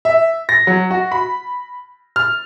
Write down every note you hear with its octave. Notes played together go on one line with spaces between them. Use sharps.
E5
A#6
F#3
F#4
B5
F6